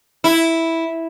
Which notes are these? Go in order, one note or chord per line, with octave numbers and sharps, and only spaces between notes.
E4